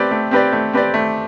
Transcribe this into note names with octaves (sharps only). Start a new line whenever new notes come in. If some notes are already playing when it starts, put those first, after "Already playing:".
Already playing: A3 C4 G4 B4 D5
A3
C4 G4 B4 D5
A3
C4 G4 B4 D5
A3